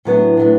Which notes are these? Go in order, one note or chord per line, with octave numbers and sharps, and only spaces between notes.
A2 F#3 B3 D4
A2 F#3 B3 D4